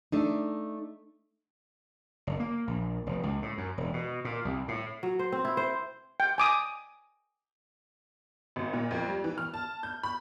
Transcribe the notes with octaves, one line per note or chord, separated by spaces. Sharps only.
A3 D4 D#4
F#1
A#3
A#1
F1
C#2
A2
F#2
E1
B2
A#2
C2
A2
F#3
C5
C4
E4
C5
G5
G#5 D6 D#6
G#1
A#2
F2
G3
E3
F6
A5
G6
B5